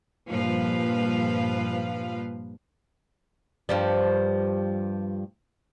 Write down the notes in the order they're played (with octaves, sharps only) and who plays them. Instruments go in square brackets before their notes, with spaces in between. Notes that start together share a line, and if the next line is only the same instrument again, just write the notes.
[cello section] G2 A#2 F3 B4 F5
[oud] G2 F3 G3